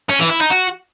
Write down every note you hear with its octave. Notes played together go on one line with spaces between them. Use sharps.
C#4
E3
E4
D#4
F#4